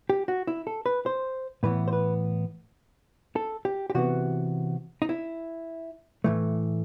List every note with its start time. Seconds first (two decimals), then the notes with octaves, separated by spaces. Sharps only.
0.10 G4
0.28 F#4
0.47 E4
0.67 A4
0.86 B4
1.06 C5
1.63 A2 E3 B3 B4
1.88 C5
1.93 B4
3.36 A4
3.65 G4
3.90 G4
3.95 C3 E3 B3 F#4
5.02 D#4
5.09 E4
6.24 A2 E3 A3